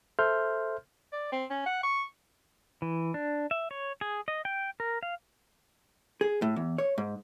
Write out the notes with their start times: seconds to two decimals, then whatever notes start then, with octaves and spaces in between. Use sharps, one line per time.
0.19 A4 C5 E5 C6 F6 G6
1.13 D5
1.32 C4
1.50 C#4
1.66 F#5
1.83 C#6
2.82 E3
3.14 D4
3.51 E5
3.71 C#5
4.01 G#4
4.28 D#5
4.45 G5
4.80 A#4
5.03 F5
6.21 G#4
6.42 A2
6.56 E2
6.78 C#5
6.98 G#2